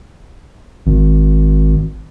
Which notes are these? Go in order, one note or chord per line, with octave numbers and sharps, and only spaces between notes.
G#1